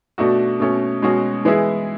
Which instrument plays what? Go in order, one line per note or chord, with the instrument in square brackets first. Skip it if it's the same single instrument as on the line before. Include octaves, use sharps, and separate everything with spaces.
[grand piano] B2 A3 D4 F#4
B2 A3 C#4
B2 G#3 C#4 F#4
E3 G#3 B3 E4 G#4